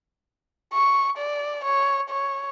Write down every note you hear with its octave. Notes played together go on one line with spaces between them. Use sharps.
C#6
D5
C#5
C#5